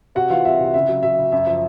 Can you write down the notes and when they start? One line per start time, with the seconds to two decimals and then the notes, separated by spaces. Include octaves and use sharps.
0.15 C3 F#4 F#5
0.30 E3 F4 F5
0.45 C2 E5
0.60 C3
0.74 C#3 E5
0.89 F#3
1.03 F#3 E5
1.18 C#3
1.32 F#2 E5
1.46 F3 E5